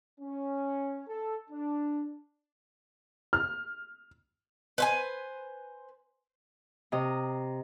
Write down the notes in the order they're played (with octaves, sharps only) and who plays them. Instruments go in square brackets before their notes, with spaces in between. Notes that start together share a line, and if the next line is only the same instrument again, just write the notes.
[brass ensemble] C#4
A4
D4
[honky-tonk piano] F6
[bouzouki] B4 C5 G#5
[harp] C3 D#5 A#5